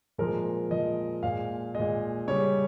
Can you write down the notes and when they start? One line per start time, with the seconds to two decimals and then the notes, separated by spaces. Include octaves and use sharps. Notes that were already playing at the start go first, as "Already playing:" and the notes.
0.18 A#2 F3 G#3 A#4
0.71 A#2 F3 G#3 D#5
1.23 A#2 G#3 F5
1.75 A#2 G#3 D#5
2.28 C#3 G3 C#5